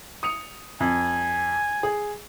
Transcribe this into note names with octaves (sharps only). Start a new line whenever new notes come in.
D#6 C#7 F7
F2 G#5
G#4